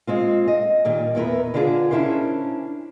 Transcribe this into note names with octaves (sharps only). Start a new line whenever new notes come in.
G#3 C4 F4
D#5
A#2 D#3 G3
E2 B3 E4 G4 A#4 B4
D3 D4 F4 F#4 G#4
C#4 D4 E4 G4 A#4 C5